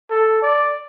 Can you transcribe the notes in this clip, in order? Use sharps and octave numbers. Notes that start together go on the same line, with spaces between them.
A4
D5